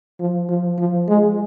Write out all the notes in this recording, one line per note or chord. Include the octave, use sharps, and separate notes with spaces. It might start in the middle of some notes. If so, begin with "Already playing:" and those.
F3
F3
F3
G#3